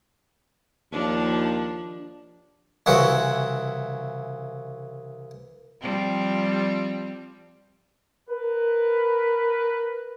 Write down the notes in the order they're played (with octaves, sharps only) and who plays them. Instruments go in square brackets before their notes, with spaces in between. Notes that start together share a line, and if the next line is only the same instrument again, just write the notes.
[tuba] D#2 [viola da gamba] F3 D4
[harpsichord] C2 C#3 E3 F#4
[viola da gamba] F3 G3 C4
[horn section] A#4 B4